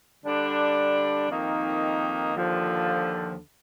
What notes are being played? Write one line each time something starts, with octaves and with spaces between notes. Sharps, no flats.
D3 G3 D4
F2 D#3 A#3 D#4
D#2 D3 F3